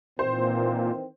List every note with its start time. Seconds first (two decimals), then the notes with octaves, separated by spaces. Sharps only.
0.19 A#2 D#3 E3 C4 C5